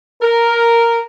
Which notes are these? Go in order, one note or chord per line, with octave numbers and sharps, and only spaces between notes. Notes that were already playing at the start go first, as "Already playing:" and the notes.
A#4